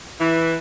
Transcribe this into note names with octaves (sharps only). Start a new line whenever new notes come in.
E3